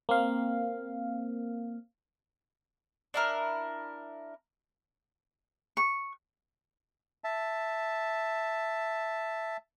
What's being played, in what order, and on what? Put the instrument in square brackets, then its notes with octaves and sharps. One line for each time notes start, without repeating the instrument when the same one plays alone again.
[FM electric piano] A#3 C4 F5
[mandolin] D4 E4 A#4
[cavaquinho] C#6
[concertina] E5 A5